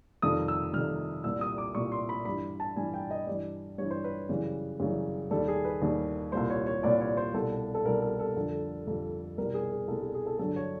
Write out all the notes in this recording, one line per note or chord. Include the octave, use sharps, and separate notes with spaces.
F2 C3 D#3 G3 D#6
E6
F2 C3 D#3 G3 F6
C2 A#2 G3 E6
D#6
D6
C2 A#2 G3 C#6
C6
B5
G2 E3 G3 B5
A5
G2 E3 G3 G#5
G5
D#5
G2 E3 G3 D5
G2 E3 G3 C#5
C5
B4
F#2 C#3 E3 G3
F#2 C#3 E3 G3
D#2 D#3 G3 A4
G#4
B4
D#2 D#3 G3
C2 A#2 G3 C5
C#5
C#5
C2 A#2 G3 D5
C#5
C5
C2 B2 G3 A4
A4
C2 B2 G3 A#4
A4
A4
F2 D3 G3
F2 D3 G3
C2 B2 G3 A#4
G#4
G#4
C2 B2 G3 A4
G#4
G#4
A4
G2 D3 F#3 A4
C#5